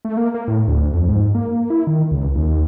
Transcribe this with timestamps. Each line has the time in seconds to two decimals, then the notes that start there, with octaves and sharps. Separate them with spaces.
0.05 A3
0.17 A#3
0.34 A#3
0.48 A2
0.68 D2
0.94 F2
1.08 G#2
1.35 A#3
1.70 E4
1.87 D#3
2.11 C#2
2.35 D#2